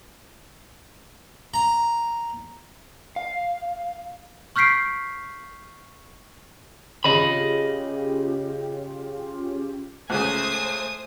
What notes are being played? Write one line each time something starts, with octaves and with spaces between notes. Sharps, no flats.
A#5
F5
C#6 F6 G6 B6 C7 D7
C#3 C#4 F4 G4 D#5 B5
C#2 C#3 A3 C5 G#5 D#6